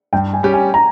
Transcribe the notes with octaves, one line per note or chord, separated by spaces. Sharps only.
G2 G5
G#5
G3 C#4 G4
G#5
A#5